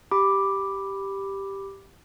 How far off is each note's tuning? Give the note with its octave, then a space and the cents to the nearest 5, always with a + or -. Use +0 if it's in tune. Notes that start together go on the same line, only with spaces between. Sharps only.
G4 +0 B5 +0 D6 +0